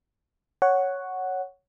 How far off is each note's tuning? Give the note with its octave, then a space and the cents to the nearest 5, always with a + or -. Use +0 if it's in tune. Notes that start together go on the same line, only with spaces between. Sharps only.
C#5 +0 F#5 +5